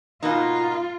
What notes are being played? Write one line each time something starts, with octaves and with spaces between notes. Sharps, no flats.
B2 A#3 D#4 F4